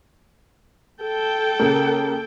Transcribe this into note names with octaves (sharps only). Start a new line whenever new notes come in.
A4 G5
C#3 A#3